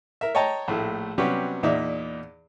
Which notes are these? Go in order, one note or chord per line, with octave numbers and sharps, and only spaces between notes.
A#4 E5
C#5 D#5 G5 A5 A#5
A#1 A2 A3
C3 F#3 G3 B3 C#4 G4
E2 A#2 D#4 D5 E5